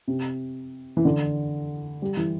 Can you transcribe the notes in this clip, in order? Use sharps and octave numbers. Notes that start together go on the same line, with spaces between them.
C3
E3
D3
G3
E3